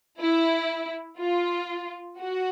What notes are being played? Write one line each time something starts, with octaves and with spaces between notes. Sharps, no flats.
E4
F4
F#4